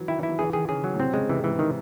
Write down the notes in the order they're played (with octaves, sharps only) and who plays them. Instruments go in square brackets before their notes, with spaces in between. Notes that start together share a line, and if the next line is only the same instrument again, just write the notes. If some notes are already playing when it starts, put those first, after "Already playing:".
Already playing: [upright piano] E3 F#3
[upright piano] D#3 [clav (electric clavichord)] E4
[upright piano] E3 [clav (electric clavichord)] E4
[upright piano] F#3
[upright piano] E3 [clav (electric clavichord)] G#4
[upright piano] D#3 [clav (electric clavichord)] G#4
[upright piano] C#3 [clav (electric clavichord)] G#4
[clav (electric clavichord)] F#3
[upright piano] A2
[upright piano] C3 [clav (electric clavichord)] C4
[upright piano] C#3 [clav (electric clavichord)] G#3
[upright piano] C3 [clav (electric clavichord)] E3
[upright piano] G#2 [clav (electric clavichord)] E3
[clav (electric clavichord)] D#3